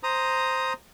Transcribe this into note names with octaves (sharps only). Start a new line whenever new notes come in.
C5 A#5 D#6